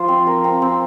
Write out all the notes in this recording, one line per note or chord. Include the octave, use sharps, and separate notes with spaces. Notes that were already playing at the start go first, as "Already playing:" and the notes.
Already playing: F3 F4 C5
C4
A#4
C4
C4